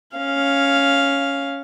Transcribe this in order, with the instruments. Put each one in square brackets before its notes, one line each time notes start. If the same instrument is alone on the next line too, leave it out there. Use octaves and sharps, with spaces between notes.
[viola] C#4 F5